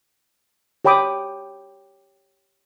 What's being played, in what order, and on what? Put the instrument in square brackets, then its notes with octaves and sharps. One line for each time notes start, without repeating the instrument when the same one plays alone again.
[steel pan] G4 C#5 G5 B5 D6 D#6